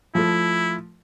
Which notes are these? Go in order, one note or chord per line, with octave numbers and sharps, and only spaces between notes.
F3 A3 E4